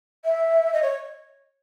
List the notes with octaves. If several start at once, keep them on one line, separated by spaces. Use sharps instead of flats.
E5
D#5
C#5